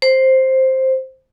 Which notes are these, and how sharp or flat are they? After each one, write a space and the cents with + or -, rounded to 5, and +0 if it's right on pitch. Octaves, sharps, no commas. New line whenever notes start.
C5 +5